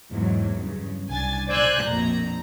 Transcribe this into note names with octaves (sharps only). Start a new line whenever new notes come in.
E2 G#2 F#3
G2 C#3
C2 D4 G#5 A6
C5 D5 G#5 E6 F#6 G6
A#1 F2 B2 A#5